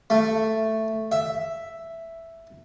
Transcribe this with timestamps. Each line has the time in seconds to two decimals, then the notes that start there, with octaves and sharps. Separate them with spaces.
0.10 A3
1.12 E5